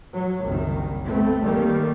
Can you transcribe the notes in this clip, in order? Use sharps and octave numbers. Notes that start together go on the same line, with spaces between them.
F#3
F#1 C2 F#2 D#3
A3 B3 C4
D#3 G3 A3 A#3